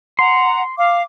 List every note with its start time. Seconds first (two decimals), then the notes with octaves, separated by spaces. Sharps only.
0.19 F#5 A#5 C6
0.77 F5 D6